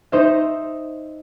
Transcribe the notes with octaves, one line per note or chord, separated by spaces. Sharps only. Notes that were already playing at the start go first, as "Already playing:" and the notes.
D#4 C5 D#5 E5